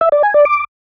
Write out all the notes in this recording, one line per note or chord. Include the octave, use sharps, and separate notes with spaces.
E5
D5
G#5
D5
D6